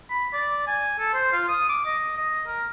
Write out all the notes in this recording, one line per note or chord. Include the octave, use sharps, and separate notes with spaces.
B5
D5
G#5
A4
C5
F4
D#6
D6
D#5
D#5
A#4